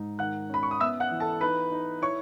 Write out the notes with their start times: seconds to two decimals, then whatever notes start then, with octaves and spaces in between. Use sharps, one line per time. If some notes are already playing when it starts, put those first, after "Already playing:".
Already playing: G#2 D#4
0.19 D#3 F#5 F#6
0.49 C#4 B5
0.63 C#6
0.71 D#6
0.80 B3 E5 E6
1.00 F#5 F#6
1.11 E3
1.20 A4 A5
1.41 D#4 B4 B5
1.72 D#4
2.02 E4 C#5 C#6